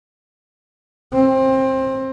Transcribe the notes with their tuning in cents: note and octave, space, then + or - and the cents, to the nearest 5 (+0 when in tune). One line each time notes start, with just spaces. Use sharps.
C4 +20